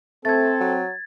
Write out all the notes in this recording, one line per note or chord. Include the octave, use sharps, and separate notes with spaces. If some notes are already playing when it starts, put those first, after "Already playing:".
A3 C4 A4 G#6 A6
F#3